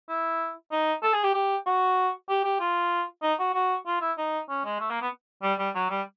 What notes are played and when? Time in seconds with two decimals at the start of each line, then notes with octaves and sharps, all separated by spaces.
0.08 E4
0.71 D#4
1.03 A4
1.13 G#4
1.23 G4
1.34 G4
1.66 F#4
2.29 G4
2.44 G4
2.59 F4
3.22 D#4
3.39 F#4
3.54 F#4
3.86 F4
4.01 E4
4.17 D#4
4.49 C#4
4.65 G#3
4.80 A3
4.90 A#3
5.01 B3
5.42 G3
5.58 G3
5.75 F#3
5.90 G3